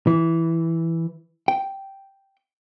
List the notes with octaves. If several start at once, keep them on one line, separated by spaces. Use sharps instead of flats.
E3
G5